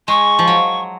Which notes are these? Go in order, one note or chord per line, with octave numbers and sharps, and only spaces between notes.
G#3 C#6
F3
F#3